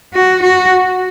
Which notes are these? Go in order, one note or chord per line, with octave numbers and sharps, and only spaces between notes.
F#4
F#4